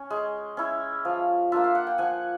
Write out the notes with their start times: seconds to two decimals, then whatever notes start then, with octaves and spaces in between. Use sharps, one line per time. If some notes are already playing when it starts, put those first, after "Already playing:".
Already playing: C#4 G#5
0.10 G#3
0.57 C#4 E4
1.05 F3
1.52 A#3 D4 F4 E5
1.64 F5
1.75 F#5
1.87 G5
1.98 F3 F#5 G#5